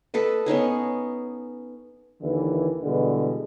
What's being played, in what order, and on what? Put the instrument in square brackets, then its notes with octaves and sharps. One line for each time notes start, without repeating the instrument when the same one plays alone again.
[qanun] A4 B4 D#5
B3 C#4 D#4 G#4
[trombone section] D#2 D3 E3
B2 D3 E3 G3 G#3